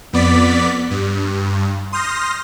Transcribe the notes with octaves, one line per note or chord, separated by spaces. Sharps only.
F2 B3 D5 B6
G2
C6 D#6 F6 G6 A#6